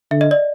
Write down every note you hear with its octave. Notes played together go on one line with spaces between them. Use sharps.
D3 E5
D#5
D5